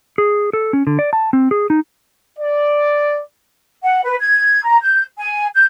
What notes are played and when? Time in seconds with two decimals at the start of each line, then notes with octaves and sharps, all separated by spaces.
0.18 G#4
0.53 A4
0.73 C#4
0.87 D3
0.99 D5
1.13 A5
1.33 C4
1.51 G#4
1.70 D#4
2.39 D5
3.82 F#5
4.03 B4
4.19 G#6
4.63 A#5
4.82 G6
5.17 G#5
5.54 G6